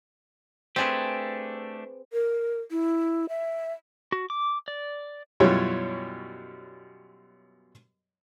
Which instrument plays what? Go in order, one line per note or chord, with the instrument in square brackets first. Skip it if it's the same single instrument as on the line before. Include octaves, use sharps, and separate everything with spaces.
[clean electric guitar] A3 D4 G4 [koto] C4 G#4 B4
[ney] A#4
E4
E5
[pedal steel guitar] F#4
D6
D5
[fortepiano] F#2 B2 G3 E4 F4 C#5